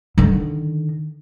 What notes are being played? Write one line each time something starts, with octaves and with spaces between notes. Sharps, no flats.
D3 D#3